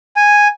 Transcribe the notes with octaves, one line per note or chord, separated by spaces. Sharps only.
G#5